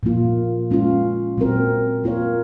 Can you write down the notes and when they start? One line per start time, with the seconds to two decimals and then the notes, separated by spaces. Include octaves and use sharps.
0.03 A#2 F3 A#3 F4
0.71 G#3 C#4 F4
1.38 A#2 F#3 C4 F#4 A#4
2.04 A#3 F4 A#4 C#5